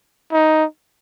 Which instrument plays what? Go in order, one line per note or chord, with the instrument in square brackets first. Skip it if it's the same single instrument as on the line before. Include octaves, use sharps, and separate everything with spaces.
[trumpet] D#4